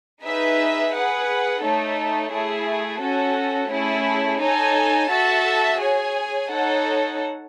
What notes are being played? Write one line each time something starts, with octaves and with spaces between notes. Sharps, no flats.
D#4 G#4 B4 E5
G#4 B4 F#5
A3 D#4 A4 C#5
A3 E4 G#4
C#4 F#4 A4
A3 C#4 E4 G#4
D#4 A4 C#5 G#5
F#4 A4 E5 A5
G#4 C#5 G#5
D#4 A4 C#5 F#5